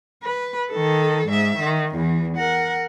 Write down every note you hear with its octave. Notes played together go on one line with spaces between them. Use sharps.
B4
D#3 A4
G#2 E5
D#3
E2 E3
A#4 F#5